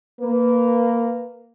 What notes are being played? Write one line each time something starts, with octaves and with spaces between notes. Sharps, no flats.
A#3 B4